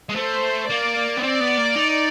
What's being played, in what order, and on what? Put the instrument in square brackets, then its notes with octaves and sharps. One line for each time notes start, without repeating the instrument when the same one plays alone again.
[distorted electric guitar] G#3
[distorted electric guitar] A3 [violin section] C5
[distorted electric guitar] A#3 [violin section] D5
[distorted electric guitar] B3
[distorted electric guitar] C4 [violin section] D5
[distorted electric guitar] B3
A#3
D#4